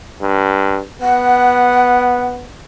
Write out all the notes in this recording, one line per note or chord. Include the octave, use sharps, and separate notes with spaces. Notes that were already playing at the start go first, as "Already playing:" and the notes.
G2
B3 F#5